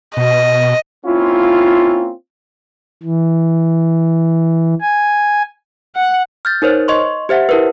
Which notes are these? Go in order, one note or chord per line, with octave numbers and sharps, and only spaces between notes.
B2 D#5
A#3 C4 C#4 E4 F4
E3
G#5
F#5
F6 G6 A6
D#4 A#4 C5 C#5
D#5 C6 C#6
G4 C5 E5 F#5
E4 A#4 B4